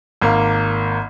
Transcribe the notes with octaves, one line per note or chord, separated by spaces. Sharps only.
G#1 A#3